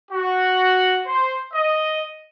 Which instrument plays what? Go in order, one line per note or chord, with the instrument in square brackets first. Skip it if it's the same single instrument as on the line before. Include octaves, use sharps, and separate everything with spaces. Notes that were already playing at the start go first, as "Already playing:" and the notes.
[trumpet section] F#4
C5
D#5